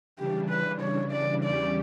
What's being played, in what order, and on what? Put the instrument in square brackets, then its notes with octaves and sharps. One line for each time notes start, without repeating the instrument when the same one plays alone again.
[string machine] C#3 E3 G3 D4 [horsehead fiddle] G4
[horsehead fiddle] B4
C#5
D5
[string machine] E2 C#3 G3 C#4 G4 [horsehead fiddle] D5